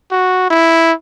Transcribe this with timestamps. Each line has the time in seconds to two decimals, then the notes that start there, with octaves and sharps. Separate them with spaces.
0.11 F#4
0.51 E4